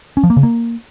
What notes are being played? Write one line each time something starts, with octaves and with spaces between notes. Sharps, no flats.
C#4
F3
A#3
C#3
A#3